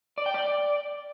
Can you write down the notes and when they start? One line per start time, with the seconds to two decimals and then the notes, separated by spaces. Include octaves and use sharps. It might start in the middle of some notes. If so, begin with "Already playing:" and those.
0.18 D5
0.26 G5
0.34 D5